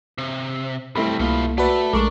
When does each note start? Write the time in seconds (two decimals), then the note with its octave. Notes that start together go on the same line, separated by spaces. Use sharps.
0.18 C3
0.95 B1 G3 A3 C4 E4 B5
1.19 C2 B2 A#3 F4
1.58 A3 F#4 B4 D5
1.93 A#1 G#3 A3 D4 A#4 C#6 D6